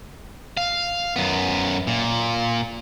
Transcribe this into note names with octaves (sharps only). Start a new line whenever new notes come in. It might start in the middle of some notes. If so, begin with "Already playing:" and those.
F5
F#2 B3
A#2